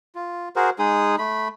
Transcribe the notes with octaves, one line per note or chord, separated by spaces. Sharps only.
F4
F#4 G#4 A#4 C5
G#3 D#4 G#4 D#6
A3 B5